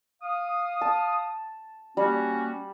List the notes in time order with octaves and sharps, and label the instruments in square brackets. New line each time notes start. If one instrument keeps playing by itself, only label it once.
[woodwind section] F5 D#6
[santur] A5
[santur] G3 [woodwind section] A#3 C#4 F#4